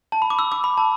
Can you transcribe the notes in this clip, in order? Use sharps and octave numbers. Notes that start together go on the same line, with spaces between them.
A5
B5
D6
E6
D6
B5
A5